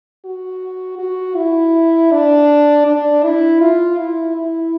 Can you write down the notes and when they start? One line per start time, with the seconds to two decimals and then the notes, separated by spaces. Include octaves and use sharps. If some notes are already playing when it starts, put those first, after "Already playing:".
0.25 F#4
0.99 F#4
1.37 E4
2.12 D4
2.87 D4
3.24 E4
3.61 F4
3.98 E4
4.36 E4